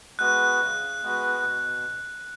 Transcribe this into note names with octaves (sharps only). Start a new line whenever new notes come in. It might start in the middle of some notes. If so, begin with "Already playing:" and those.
G#3 B3 F#4 B4 F#6
C#3
G#3 B3 F#4 B4
B2